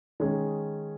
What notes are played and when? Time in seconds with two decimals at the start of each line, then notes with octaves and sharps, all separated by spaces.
0.20 D#3 G#3 C#4 G#4